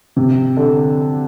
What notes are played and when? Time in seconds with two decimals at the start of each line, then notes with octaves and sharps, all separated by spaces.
0.16 C3
0.57 D3